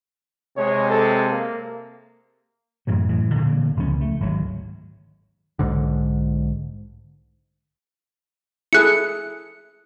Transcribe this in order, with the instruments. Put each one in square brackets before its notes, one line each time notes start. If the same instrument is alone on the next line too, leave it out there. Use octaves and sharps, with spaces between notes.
[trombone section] C3 G#3 [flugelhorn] C#5
[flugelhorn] A4
A#3
[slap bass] F#2 A2 E3 F#3
F#2 A2 E3
A#2 D3 E3 A#3
E1 C#2 F3 C#4
A3
G#1 D2 F#3
[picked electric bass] B1 G#2 D3
[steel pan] E4 G#4 A4 [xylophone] F#6 C#7